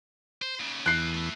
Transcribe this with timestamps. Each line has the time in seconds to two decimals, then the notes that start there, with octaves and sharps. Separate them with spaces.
0.42 C5
0.60 D#2 C#3
0.86 E2 A4 G5 F#6 C7
1.14 A3 E4